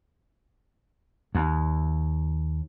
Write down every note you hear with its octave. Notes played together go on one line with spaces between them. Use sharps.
D#2